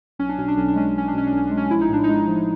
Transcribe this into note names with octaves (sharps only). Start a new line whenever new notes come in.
B1 C#4
D4
B2 C#4
D4
B1 C#4
D4
G#3 C#4
D4
B1 C#4
D4
B2 C#4
D4
B1
C#4
G#3 D4
C#4
A#1 E4
D#4
A2 D4
G#3 D#4
F3